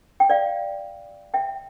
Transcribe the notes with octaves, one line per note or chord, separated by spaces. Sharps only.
G5
D5 F5
E5 G5